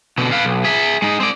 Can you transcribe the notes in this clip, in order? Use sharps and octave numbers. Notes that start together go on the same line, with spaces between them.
B2 D3
B4 F5
B1
G#4 E5
G#3 D#4
C4 D5